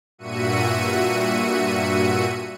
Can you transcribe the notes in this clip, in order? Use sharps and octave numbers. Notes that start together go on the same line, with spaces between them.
G2 A#2 F#4 E5 C#7 D#7